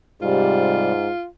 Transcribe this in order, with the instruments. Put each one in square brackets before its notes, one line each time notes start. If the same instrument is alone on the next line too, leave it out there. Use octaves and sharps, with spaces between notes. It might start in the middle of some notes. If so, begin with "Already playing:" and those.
[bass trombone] G#2 [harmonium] C3 G3 [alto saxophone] F4